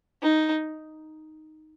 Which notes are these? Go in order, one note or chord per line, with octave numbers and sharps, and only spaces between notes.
D#4